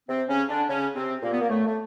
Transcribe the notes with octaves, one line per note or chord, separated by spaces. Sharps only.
C3 C4
C#3 C#4
D3 D4
C#3 C#4
C3 C4
A#2 A#3
B3
A#3
A2 A3
A3